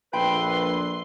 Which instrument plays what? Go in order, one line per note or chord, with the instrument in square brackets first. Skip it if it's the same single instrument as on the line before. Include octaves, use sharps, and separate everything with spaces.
[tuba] A#1 [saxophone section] A4 B4 [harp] G5 B5 [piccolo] C6